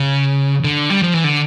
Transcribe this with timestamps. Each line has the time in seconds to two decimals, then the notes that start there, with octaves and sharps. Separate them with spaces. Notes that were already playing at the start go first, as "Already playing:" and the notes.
Already playing: C#3
0.65 D3
0.90 G3
1.02 F3
1.14 E3
1.24 D3